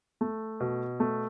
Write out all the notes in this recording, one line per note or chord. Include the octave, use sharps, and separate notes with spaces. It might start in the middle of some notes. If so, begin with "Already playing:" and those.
A3
B2
A3